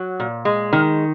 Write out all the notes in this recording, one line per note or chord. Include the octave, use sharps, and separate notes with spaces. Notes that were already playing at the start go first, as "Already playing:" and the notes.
Already playing: F#3
A#2
G#3
D#3